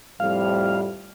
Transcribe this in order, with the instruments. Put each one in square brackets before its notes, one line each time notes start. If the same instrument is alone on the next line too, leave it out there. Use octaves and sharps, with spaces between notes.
[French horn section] F2 A2 G3 [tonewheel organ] F5